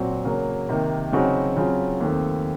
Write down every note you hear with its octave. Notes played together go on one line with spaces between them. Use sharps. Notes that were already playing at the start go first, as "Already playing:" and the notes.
Already playing: A#2 F#3 C4 F#4
C#3 F#3 A#3
C3 D#3 A#3
C#3 F#3 C4 D#4 F#4
C#3 F#3 C4 F4
D#2 D#3 A3 C4